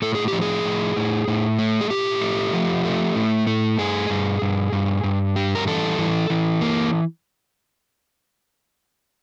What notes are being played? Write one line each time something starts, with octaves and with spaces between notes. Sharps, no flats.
A2 A4
G#4
G4
F3
G#4
A2
A2
A2
A3
G#4
A2 G4
A3
F3
A3
A2
A3
G2 G#4
G2
G2
G2
G2
G3
A#4
E3 A4
E3
E3
A#3